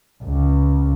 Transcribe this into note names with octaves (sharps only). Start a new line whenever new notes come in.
C#2